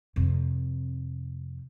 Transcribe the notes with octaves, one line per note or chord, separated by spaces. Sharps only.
F2 C3